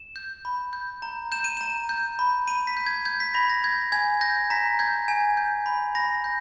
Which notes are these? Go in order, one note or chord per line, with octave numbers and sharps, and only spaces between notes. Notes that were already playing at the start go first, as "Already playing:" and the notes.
Already playing: E7
G6
B5
G6
A#5
G6 E7
D#7
A#5 E7
G6
B5
B5 D#7
B6
G6
G#6
G6 G#6
B6
B5 A#6
A#6
G6 G#6
G#5 G#6
G6 A#6
A#5 B6
G6 G#6
G#5
G6
B5
B5 A#6
G6